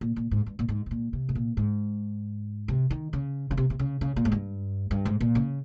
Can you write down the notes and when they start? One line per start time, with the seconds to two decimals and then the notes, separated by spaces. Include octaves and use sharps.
0.01 A#2
0.16 A#2
0.31 G#2
0.46 G2
0.59 A#2
0.69 G#2
0.86 C3
0.91 A#2
1.13 C3
1.29 G#2
1.35 A#2
1.57 G#2
2.68 C3
2.90 D#3
3.13 C#3
3.51 C#3
3.57 C3
3.70 C3
3.79 C#3
4.01 C#3
4.16 A#2
4.25 G#2
4.32 G2
4.91 G2
5.05 G#2
5.21 A#2
5.35 C#3